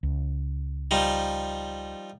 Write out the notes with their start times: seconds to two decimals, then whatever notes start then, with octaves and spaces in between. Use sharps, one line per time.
0.03 C#2
0.91 F3 G3 D#4